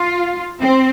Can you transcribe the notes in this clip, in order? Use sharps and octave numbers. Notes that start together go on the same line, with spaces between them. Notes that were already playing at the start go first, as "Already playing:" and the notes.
Already playing: F4
C4